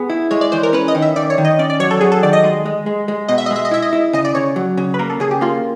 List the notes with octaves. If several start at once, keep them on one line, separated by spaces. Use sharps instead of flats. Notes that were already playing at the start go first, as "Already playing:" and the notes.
Already playing: B3 G#4
E4
G#3 C#5
D5
E3 C5
A#4
C#4 B4
D#5
D#3
E5
D#3 D5
C#5
D#3
D#5
C#4 D5
D5
F#3 C#5
A4
F#3 G#4
A4
D#3 D5
D#5
G#3
G#3
G#3
G#3
B2 D#5
E5
D#5
G#3 E5
D#5
E4 E5
D#5
E4
C#3 D#5
D5
C#3 C#5
F#3
C#3
B4
A#3 A#4
A4
C#3 G#4
G4
A#3 F4